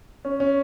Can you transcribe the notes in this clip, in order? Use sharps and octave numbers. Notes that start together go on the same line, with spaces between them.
C#4
C#4